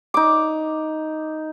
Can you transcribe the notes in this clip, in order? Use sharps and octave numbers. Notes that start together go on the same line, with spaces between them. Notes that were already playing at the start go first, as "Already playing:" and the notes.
D#4 D6